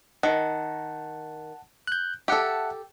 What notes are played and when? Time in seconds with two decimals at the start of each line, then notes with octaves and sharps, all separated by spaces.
0.23 D#3 F#5 A5
1.87 F#6 G6
2.28 G4 A4 E5 F#5 A5